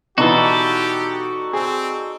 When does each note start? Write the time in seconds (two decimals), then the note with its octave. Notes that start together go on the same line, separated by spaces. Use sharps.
0.18 B2 E3 D#4 F#4 G4 A4 D5 C6
1.53 C4 G#4